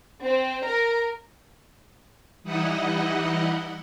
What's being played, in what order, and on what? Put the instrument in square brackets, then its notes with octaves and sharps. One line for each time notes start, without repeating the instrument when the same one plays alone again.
[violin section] C4
A#4
[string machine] E3 G3 D#4 E4 D#5 F#5